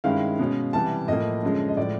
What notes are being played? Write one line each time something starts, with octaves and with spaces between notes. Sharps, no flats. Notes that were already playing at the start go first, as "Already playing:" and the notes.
G2 D#3 G#3 C#4 E4 F5
B2 G#3 C#4
C3 E3 G3 A5
A2 F3 A#3 D#5
F#2 D3 F3 G#3 C#4
D#5
A2 F3 G#3 D5